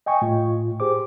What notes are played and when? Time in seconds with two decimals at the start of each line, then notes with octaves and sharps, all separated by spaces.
0.06 D#5 G5 G#5 C#6
0.22 A2 F4
0.80 G4 G#4 C5 D6